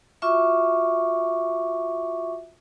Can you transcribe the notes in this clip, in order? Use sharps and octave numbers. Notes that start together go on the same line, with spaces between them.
F4 F#4 E5 C#6 D6